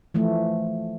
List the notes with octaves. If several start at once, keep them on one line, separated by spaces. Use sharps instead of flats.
E3 F3 A3